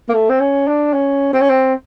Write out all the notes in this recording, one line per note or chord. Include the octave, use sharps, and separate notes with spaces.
A#3
A3
C4
C#4
D4
C#4
C4
C#4
C4